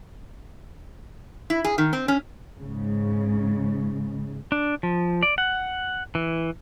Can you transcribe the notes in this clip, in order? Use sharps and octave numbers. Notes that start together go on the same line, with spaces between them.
E4
G#4
D#3
C4
C#4
G#2 C#3
D4
F3
D5
F#5
E3